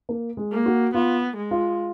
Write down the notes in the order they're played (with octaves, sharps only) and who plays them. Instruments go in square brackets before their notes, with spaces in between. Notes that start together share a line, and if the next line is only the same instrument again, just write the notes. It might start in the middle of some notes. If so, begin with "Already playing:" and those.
[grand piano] A#3
G#3
[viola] A#3
[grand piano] F#4
[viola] B3 [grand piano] F4
[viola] G#3
[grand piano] F4